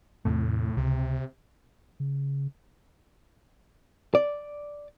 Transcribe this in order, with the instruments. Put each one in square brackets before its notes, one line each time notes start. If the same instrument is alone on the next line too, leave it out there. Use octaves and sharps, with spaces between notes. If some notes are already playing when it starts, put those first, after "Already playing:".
[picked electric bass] E2 C3 A3 [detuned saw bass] A2
[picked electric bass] C#2 [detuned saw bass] C3
[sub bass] C#3
[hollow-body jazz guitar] D5